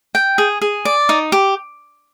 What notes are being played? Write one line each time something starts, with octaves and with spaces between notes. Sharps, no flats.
G5
G#4
G#4
D5
D#4
G4